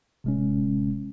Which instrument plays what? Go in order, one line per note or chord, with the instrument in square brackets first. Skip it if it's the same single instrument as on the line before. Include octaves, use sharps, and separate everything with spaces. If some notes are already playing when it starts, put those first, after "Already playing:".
[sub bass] D1 [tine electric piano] C3 G#3 C#4